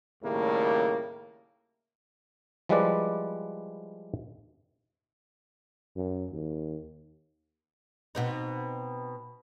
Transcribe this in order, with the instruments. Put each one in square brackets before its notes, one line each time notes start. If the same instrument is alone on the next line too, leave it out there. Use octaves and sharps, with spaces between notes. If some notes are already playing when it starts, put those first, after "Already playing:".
[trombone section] D#2 A2 C#3 G3 A3 A#3
[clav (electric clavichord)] F3 G3 G#3 E4 B4 D5
[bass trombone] F#2
D#2
[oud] B2 C4 D#4